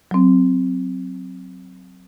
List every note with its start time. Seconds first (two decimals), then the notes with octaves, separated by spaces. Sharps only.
0.11 F#3 C4